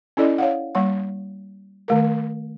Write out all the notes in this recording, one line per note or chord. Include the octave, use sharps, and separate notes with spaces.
C#4 E4 A4 D5 D#5
C#5 F5 F#5
G3 A#3 F#5
D#3 A3 A#4